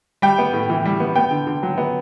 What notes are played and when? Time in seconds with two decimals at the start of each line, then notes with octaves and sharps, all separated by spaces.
0.22 G3 G5
0.39 B3
0.53 A2
0.70 E3
0.85 G3
1.00 B3
1.16 B3 G5
1.31 D3
1.47 D3
1.63 F#3
1.78 B3